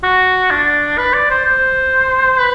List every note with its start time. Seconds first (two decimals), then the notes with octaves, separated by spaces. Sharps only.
0.03 F#4
0.51 D4
0.98 B4
1.14 D5
1.30 C5
1.45 C5
2.39 B4